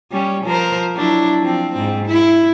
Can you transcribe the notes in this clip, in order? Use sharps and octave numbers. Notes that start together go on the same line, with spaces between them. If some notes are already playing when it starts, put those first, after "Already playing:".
G3 C#4
F3 A#4 C5
F#3 D4 E4
F3 C4
G#2 C4
E4